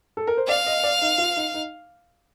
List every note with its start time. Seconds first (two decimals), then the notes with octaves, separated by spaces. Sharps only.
0.17 A4
0.27 A#4
0.37 C5
0.48 D5 F5
0.66 D#5
0.84 D5
1.02 D#4
1.18 F4
1.36 D#4
1.54 D#4